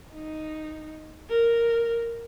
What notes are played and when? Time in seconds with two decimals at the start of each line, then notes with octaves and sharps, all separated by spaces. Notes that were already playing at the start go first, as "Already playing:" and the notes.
0.14 D#4
1.29 A#4